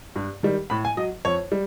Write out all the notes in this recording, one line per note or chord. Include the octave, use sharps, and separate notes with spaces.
G2
D#3 G3
A2 B5
G#5
F#3 D#5
F2 C#5
G3